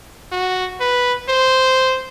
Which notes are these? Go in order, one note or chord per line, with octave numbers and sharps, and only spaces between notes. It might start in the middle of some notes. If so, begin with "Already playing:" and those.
F#4
B4
C5